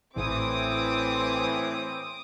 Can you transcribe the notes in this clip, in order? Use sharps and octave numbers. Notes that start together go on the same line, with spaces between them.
A1 A2 E3 C4 D6 D#6